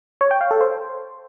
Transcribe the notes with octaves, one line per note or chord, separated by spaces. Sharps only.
C#5
G5
F5
A4
C5